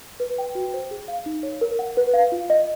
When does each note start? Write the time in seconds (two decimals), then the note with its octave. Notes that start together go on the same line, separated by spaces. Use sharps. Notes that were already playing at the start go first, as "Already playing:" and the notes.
0.20 B4
0.38 G5
0.55 F#4
0.74 C5
0.91 G#4
1.08 F5
1.26 D#4
1.43 C#5
1.61 A#4
1.79 F#5
1.97 B4
2.13 F5
2.32 F4
2.50 D#5